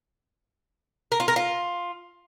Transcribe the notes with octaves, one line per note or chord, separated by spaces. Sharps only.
A#4
F4
A#4
F4